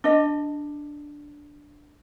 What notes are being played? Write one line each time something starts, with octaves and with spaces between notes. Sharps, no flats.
D4 D#5